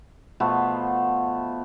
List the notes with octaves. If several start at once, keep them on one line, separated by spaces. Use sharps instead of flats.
B2 F3 A3 B3